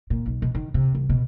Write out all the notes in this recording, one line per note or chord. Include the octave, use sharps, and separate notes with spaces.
A#2
B1
B2
D#3
C3
C2
B2